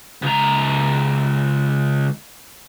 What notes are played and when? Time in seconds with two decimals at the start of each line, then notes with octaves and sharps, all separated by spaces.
0.22 C#2 A#5